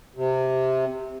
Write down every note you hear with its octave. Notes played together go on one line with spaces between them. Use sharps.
C3